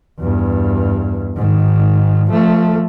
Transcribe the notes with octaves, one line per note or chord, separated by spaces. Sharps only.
E2 G2
G#2 D#3
F3 A3